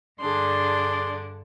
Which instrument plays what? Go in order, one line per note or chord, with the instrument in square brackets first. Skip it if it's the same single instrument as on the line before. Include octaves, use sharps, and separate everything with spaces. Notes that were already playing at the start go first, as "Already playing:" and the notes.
[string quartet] G2 D3 D4 [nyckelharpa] G#4 C6 [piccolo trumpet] D5